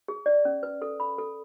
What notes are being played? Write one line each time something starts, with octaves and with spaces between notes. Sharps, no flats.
G#4
D5
C#4
B4
A4
B5
A4